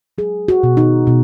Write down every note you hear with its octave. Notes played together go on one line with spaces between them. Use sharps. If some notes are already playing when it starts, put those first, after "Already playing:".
F#3 G#4
F#4
B2
D#4
B2